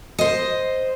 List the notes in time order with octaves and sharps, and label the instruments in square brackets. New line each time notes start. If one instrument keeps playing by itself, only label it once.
[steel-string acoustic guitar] C5 D#5